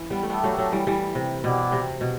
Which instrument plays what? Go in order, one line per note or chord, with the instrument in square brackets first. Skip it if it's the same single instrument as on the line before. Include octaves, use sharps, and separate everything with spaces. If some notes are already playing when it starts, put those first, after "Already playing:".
Already playing: [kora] E3
G3 B3
A3
[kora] G3 B3 [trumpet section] D4 A4 E5 G5
[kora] F#3 A3
F#3 A3
E3 G3
E3 G3
C3
[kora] B2 [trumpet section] E4 G4 D5 F#5
[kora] C3
B2